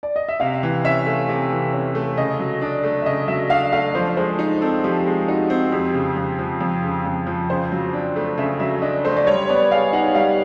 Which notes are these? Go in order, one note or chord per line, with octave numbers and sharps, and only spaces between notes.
D5
D#5
E5
C3 F5
E3
C#4 E5
A3
C3
E3
C#4
A3
C#3 D#5
F#3
D4 D5
A3
E5
C#3 D#5
F#3 E5
D4 F5
A3 F5
F3 C5
G#3 C5
D#4
C4 A4
F3 G4
G#3
D#4 F#4
C4
F2 G4
C#3
F2
F3
F2
C#3
F2
F3
C#3 C5
F#3
D4
A3
C#3 E5
F#3 E5
D4 D#5
A3 C5
D5
G3 C#5
B3 D5
G#4 F5
D#4 F#5
G3 F5